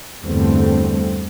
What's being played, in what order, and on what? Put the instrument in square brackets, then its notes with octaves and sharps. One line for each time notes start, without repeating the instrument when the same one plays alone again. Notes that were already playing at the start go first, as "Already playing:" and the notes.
[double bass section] E2 G2 D3 G3 A3 C4